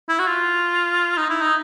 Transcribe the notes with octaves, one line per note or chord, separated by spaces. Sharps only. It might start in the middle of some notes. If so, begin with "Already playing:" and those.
E4
F#4
F4
D#4
E4
D#4